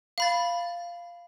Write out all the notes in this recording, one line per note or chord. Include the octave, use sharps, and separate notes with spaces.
F5 B5 A6